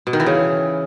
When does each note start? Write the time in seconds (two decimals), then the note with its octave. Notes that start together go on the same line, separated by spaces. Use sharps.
0.07 B2
0.13 D#3
0.20 E3
0.26 C#3